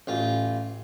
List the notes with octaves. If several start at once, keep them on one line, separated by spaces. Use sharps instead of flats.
A1 F4